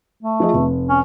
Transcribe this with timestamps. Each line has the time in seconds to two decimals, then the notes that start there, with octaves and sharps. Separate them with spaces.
0.23 A3
0.40 F3 G#4 D#5
0.54 F1
0.89 C#4